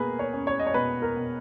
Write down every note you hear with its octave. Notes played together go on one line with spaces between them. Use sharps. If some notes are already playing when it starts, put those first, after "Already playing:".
Already playing: B2 A#3 G#4 A#4 B4
C#5
C#4
C#5
D#5
C#5
B2 B4
A#4
B2